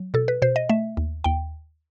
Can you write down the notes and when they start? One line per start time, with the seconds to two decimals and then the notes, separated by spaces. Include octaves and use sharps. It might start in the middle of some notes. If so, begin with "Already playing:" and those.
Already playing: F#3
0.14 B2 A4
0.28 B4
0.42 B2 C5
0.56 D#5
0.69 A3 E5
0.97 D#2
1.24 D#2 G5